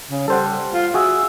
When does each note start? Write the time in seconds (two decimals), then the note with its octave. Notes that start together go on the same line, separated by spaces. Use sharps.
0.10 C#3
0.28 G3 A4 C5 F#5
0.72 F4
0.94 F#4 G#4 E5